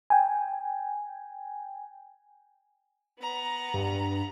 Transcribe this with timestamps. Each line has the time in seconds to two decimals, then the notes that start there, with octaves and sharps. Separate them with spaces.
0.10 G5 G#5
3.20 B3 A#5
3.74 G2